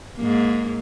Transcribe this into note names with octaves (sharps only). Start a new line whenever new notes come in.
G#2 A#3